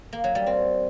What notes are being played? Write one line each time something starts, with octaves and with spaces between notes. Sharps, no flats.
A#3
F#3
G3
C4